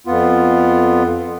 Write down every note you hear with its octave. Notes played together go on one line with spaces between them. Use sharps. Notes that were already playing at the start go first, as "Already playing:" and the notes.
F2 B3 F4